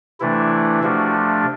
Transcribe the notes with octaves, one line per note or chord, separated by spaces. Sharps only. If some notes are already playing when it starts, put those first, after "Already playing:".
C3 E3 A3 D4 E4
C3 F3 A3 D4 F#4